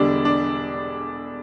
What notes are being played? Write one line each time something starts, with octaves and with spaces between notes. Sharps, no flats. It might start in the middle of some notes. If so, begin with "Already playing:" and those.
Already playing: E1 E2 D3 G3 D4
D4